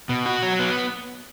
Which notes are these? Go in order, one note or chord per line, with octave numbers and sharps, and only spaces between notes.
B2
F#4
F#3
B3